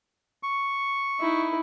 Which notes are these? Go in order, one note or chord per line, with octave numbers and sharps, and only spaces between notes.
C#6
D#4 E4